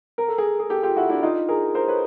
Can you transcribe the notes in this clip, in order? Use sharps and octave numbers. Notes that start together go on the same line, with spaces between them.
A#4
A4
G#4 A#4
G#4
G4 A4
F4 G4
E4 F#4
D4 E4
D#4 F4
G#4 A#4
A#4 C5
B4 C#5